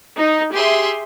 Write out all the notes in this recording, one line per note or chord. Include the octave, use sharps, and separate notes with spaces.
D#4
G4 G#4 E5 C6